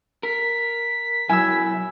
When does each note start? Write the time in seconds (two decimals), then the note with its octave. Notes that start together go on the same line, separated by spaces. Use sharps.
0.23 A#4 B6
1.29 B1 F#3 E4 G#5 E6